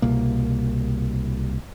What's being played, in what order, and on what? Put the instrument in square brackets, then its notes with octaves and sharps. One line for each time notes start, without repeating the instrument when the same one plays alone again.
[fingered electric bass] C2 B2 A#3